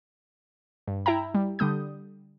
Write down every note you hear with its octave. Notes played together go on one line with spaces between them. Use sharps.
G2
E4 E5 G5 A#5
G3
D3 G3 D#6 G6